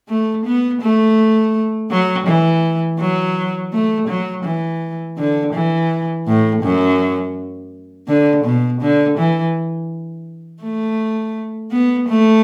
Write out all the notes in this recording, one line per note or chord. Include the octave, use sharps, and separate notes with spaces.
A3
B3
A3
F#3
E3
F#3
A3
F#3
E3
D3
E3
A2
F#2
D3
B2
D3
E3
A3
B3
A3